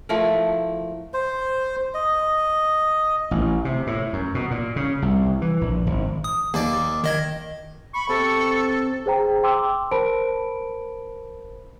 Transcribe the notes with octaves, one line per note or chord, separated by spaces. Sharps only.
F3 A3 E4 A#4
C5
D#5
A1
C3
A2
F#2
B2
A#2
C#3
C2
E3
A#1
G#1
D#6
D#2 A#3 D5
D#3 D#5 G#6
B5 C#6
C3 A4
G#4 C5 G5 A#5
G5 C6 D6 E6
A#4 C5 A5 B5 D7